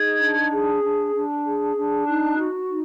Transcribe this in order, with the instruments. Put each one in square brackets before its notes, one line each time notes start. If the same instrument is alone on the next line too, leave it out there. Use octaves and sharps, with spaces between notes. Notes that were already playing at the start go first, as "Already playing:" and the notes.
Already playing: [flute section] D#4 G#4 G#6
D4
G#4
D4
D4
G#4
D4
D#4 F#6
F#4
D#4